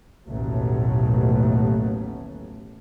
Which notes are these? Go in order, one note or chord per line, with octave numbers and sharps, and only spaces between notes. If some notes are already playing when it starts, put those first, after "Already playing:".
A1 D#2 B2 F#3 A3